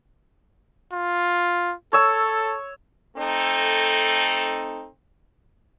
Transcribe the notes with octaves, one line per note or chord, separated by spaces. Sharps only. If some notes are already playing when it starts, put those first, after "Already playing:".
F4
A4 C#5 E6
A3 C4 D#4 A4